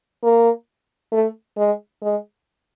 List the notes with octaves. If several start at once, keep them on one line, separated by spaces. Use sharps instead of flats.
A#3
A3
G#3
G#3